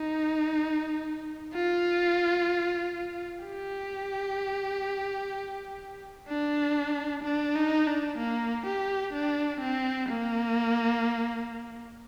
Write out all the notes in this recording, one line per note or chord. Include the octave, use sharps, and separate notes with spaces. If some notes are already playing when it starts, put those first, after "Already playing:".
Already playing: D#4
F4
G4
D4
D4
D#4
D4
A#3
G4
D4
C4
A#3